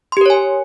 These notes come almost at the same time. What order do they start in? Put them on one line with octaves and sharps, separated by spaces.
C6 G4 A#4 C#5 G#5